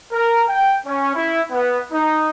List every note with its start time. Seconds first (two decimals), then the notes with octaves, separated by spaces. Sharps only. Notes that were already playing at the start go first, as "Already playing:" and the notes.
0.12 A#4
0.47 G5
0.86 C#4
1.15 E4
1.52 B3
1.92 D#4